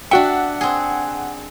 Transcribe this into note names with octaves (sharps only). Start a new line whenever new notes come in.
D4 F#4 E5 F#5 G5 C#7
C4 G#4